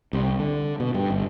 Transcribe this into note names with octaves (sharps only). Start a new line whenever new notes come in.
C2
D3
B2
G2
G1